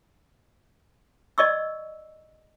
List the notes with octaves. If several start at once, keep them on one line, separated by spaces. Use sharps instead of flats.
D5 D#5 C#6 E6